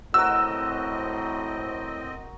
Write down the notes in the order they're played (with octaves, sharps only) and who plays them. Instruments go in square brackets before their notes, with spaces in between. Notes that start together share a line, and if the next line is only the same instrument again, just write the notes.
[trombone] A2 [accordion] C4 D#5 [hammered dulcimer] F#4 A#4 [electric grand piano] E6